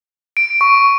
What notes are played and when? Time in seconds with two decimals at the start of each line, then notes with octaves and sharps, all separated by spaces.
0.37 D7
0.61 C#6